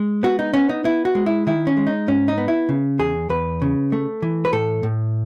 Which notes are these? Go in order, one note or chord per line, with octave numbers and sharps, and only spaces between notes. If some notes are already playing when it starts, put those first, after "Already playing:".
Already playing: G#3
B3 F#4
D#4
B3 C#4
D#4
B3 E4
F#4
G#3
E4
D#3 E4
C#4
G#3
D#4
G#2 C#4
D#4
B3
E4
C#3
E2 G#4
E2 B4
C#3
A3
E3
B4
A2 A4
A2